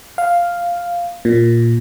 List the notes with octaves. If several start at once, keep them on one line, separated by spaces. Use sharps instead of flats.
F5
A#2